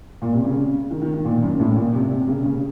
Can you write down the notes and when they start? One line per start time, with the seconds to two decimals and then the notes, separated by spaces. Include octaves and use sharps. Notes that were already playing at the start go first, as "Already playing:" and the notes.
0.22 A#2
0.33 C3
0.45 C#3
0.91 D#3
1.02 D#3
1.14 D#3
1.25 A#2
1.42 F#2
1.59 A2
1.76 A#2
1.93 C3
2.11 C3
2.28 C#3
2.45 C#3